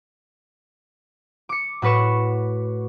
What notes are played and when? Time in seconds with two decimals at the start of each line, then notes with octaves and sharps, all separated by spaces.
1.49 D6 C#7
1.82 A2 F#4 B4 C#6 E7